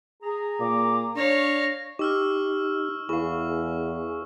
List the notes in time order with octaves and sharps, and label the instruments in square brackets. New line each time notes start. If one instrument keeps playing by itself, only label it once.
[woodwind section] G#4 A#5
[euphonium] A#2 [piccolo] D6
[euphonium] D4 [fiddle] C#5 F5 [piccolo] A#6
[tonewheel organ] D#4 [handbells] G4 [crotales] C#6 E6 F6
[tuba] E2 [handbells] E4 F5 [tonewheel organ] G#4 [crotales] C#6